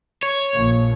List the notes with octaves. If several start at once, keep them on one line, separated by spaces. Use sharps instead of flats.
C#5
A#1